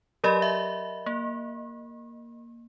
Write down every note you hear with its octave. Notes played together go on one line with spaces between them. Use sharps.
F#3 G4 A#4 D5 D#5 B5
E5
A#3